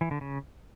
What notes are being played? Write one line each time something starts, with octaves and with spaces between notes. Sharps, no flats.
E3
D3
C#3